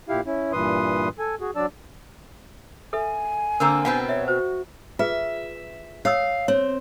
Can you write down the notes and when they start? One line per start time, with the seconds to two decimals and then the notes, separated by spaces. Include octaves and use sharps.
0.09 A#2 E4 G4 F5
0.26 C#4 E4
0.52 G2 A#2 E3 B4 C6 D#6
1.19 A4 G#5
1.41 F#4 G#4
1.56 F#3 D4 D5 A5 E6
2.93 A4 B4 E5 G#5
3.60 D3 A#3 C4 A#4 A#5 E6
3.85 B2 B3 C4 F5 F#5
4.09 C#5 E5
4.28 F#4 C5
4.99 F4 G#4 B4 E5
6.05 C#5 F5 D#6 E6
6.48 C4 C#5